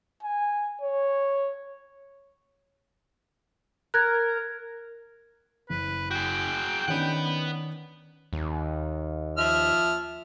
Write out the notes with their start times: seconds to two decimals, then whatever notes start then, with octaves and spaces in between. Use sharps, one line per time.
0.23 G#5
0.81 C#5
3.94 A#4 F#6 G#6
5.70 F#1 B4
6.11 F#4 G#4 G5
6.88 D#3 C#4 D4 B4 F#5
8.33 D#2
9.38 F3 E5 F6